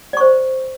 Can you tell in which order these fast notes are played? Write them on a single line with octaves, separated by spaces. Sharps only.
D5 C#6 C5